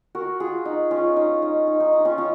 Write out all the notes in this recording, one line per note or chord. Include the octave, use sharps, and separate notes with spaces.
F#4 A#4
F4 G#4
D#4
C#4 F4
D#4
D#4
D#4
D#4
D#4
C#4 F4
C#4 F4